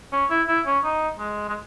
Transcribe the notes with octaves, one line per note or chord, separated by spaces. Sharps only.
C#4
E4
E4
C#4
D#4
G#3
G#3